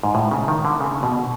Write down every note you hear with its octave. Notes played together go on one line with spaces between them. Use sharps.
G#2
A2
C#3
D#3
D3
C#3
B2